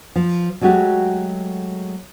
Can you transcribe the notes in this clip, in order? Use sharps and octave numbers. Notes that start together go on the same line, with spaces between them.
F3
F#3 G#3 A3 F#4 G4